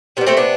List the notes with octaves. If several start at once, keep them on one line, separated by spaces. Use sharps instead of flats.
C3 G3 B3
A3 C4
B3 D4